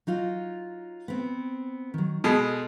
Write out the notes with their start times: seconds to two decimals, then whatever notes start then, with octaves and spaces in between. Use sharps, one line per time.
0.07 F#3 D#4 F4
1.08 B3 C4
1.94 D#3 F#3
2.24 B2 G#3 A4 D#5